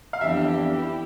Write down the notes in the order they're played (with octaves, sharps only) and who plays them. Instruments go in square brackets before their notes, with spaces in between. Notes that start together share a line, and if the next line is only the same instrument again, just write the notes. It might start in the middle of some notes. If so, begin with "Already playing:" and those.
[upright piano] F5
[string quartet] F2 E3 B3 D4 G4 [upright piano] E5
[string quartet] E4 G4